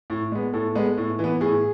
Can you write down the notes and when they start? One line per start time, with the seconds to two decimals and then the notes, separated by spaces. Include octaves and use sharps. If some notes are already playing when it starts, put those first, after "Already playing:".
0.10 A2
0.32 G#3 B3
0.54 A2 A4
0.75 G#3 B3
0.97 A2
1.19 E3
1.24 B3
1.41 A2 G#4